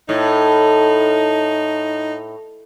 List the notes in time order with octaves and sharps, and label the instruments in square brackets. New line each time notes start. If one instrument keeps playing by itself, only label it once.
[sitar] A2 [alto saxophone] D#4